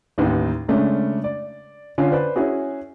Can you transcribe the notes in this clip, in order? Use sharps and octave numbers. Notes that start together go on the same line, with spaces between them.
A1 D#2 D#4 B4
C#3 G#3 A3 C#4 D4
D5
D3 C#4 F4 G#5
B4 C5 D5
C#4 E4 F#4 G#4